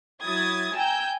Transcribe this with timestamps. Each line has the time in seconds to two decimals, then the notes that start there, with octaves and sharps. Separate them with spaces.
0.23 F#3 E4 D#6 G#6 A6
0.75 G5 G#5 A#5 E6 G6